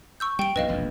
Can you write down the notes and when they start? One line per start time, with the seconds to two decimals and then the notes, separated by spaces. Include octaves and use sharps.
0.20 C#6 E6 G6
0.39 G3 G5 D7
0.56 B1 F#2 B4 D#5 F5
0.68 E1 A#1 F2